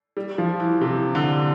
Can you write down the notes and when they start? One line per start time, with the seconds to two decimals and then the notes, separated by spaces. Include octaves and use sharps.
0.17 G3
0.38 F3
0.60 E3
0.81 C3
1.15 D3